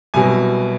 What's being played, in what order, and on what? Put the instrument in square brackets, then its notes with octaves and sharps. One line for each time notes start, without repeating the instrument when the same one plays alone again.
[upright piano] C2 B2 F#3 G#5